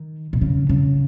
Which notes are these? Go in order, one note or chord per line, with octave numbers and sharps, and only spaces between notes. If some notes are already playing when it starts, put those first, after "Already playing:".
Already playing: D#3
B2
C#3
C#3